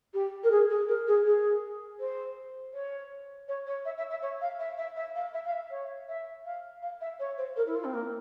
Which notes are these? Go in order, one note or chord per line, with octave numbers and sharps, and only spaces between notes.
G4
A#4
G#4
G#4
A#4
G#4
G#4
C5
C#5
C#5
C#5
E5
E5
E5
C#5
F5
E5
E5
E5
F5
E5
F5
E5
C#5
E5
F5
F5
E5
C#5
C5
A#4
E4
F4
C4
A#3